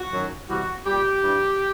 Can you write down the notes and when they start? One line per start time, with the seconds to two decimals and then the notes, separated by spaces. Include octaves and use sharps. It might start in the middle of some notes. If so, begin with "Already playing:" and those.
Already playing: F#4
0.12 F#2 D#3 F#3
0.48 C3 E3 G3 F#4
0.85 A#2 G3 G4
1.22 G2 E3 G3